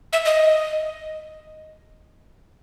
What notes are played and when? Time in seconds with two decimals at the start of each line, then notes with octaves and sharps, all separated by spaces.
0.13 E5
0.25 D#5